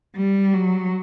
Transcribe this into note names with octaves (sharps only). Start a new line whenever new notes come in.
G3
F#3